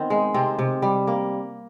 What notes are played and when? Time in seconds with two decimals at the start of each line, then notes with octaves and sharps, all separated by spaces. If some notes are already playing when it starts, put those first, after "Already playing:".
Already playing: D#3 B3 C4
0.10 G#3
0.34 C3 C4
0.59 C3
0.82 G3
1.07 A#3